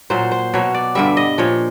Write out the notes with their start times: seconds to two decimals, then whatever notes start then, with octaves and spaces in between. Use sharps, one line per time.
0.10 A#2 F#3 C5
0.31 C5
0.54 B2 F#3 C#5
0.74 D5
0.95 G2 D3 G3 E5
1.17 D#5
1.38 A#2 F3 C#5